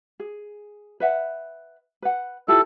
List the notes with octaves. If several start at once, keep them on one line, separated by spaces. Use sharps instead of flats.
G#4
B4 E5 F#5
B4 F#5
E4 F4 G4 A4